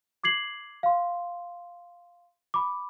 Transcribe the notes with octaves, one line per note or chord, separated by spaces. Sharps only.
D6 G#6 C7 F#7
F5 C6
B5 D6